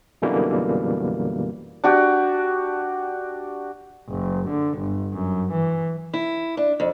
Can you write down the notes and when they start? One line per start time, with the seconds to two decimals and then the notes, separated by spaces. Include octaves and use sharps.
0.22 F#2 B2 D3 E3 G3 A#3
1.84 D4 F#4 G4
4.09 F#1
4.49 D3
4.78 G1
5.13 F#2
5.52 E3
6.14 E4
6.57 D4
6.80 F2